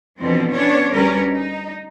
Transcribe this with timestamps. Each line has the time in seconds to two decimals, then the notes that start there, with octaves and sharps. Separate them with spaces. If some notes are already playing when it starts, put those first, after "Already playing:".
0.18 F2 B2 D3 E3 F3 C4
0.50 B3 C#4 D4 C#5
0.93 D2 G3 C#4 A#4 B4
1.30 D#4